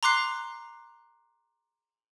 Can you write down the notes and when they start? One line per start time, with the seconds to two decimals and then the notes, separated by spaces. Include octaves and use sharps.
0.03 A#5 C6 D6 F#6 C7